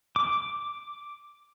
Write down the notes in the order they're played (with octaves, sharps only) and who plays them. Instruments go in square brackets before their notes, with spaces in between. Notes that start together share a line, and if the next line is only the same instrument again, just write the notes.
[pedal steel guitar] D6